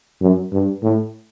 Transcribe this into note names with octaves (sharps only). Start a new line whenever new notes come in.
F#2
G2
A2